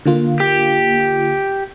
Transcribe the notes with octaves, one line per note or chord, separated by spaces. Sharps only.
D3 A#3 F4
G4